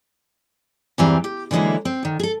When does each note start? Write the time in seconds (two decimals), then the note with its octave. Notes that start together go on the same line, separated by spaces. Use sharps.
0.98 E2 G2 E3 G3 C4 A#5
1.24 G4
1.51 D3 E3 F#3 G#3 A#3 E4
1.85 C4
2.03 D2 D#3
2.19 G#4 A4